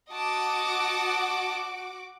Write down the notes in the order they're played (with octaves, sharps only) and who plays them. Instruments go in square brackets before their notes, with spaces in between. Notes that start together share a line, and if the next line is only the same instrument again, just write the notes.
[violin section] F#4 F#5 D6 [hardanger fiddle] D#5 A5